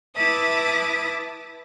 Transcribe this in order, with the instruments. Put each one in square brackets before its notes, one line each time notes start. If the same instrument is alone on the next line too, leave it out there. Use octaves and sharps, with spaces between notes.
[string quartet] E4 B4 E5 A5 D6 D#6